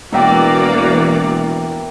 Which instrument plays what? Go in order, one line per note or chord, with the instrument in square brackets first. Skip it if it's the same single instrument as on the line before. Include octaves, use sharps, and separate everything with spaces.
[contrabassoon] E1 [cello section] E3 [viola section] A#3 F#4 D5 [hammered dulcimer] A#4 E5 G5